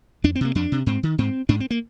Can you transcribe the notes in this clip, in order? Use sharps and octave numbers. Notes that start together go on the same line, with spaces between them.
F2 D4
C4
C3 A#3
F2 D4
C3
G#2 C4
D#3
G#2 C4
G#2 D4
C4
A#3